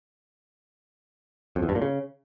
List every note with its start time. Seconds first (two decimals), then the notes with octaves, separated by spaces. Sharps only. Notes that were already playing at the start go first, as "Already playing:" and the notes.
1.56 F2
1.62 E2
1.69 G2
1.75 A#2
1.82 C#3